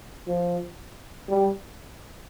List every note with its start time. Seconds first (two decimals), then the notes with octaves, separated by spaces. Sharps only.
0.27 F3
1.29 G3